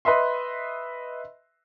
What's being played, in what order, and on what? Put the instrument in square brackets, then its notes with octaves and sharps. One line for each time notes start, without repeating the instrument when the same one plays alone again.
[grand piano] B4 D#5 E5 C6